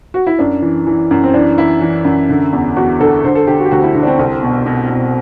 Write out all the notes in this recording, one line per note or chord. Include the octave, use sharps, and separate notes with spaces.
F#4
E4
F#2 D4
E3
E3
F#2
C4
E3 D4
E3 E4
E3
F#2
D3
E2
E2 F#4
D3 A4
D3 C5
A4
D3 G4
F#4
G4
D2 F#4
E4
D3
D4
C4
C2
B2
B2
B2